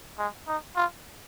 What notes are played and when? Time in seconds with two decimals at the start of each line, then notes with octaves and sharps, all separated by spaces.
0.18 G#3
0.48 D#4
0.76 F4